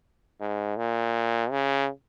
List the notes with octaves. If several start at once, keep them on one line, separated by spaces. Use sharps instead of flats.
G#2
A#2
C#3